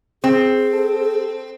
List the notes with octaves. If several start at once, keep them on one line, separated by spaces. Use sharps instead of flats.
C4 G#4
A4